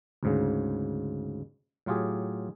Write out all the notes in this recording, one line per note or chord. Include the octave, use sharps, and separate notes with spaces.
D2 G#2 C#3
A2 F#3 F4 G4 G#4